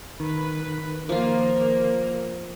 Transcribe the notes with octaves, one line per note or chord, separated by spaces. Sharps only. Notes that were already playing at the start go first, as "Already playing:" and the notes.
D#3 B4
F3 A#3 F4 A#4